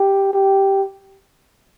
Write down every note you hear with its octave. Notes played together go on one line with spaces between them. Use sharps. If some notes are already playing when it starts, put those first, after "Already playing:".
Already playing: G4
G4